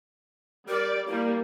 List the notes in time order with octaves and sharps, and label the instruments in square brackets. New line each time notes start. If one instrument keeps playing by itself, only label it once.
[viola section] G3 D5 [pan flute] A#4
[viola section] G3 A#3 [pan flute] E4